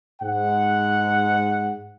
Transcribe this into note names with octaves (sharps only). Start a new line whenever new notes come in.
G#2 F#5